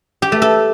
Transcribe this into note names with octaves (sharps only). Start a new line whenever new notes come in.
G4
A3
A4